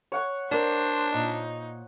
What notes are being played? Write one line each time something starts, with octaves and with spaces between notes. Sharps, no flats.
C#5 F#5 C#6
D4 A#4 C5 D5
A#2 D#4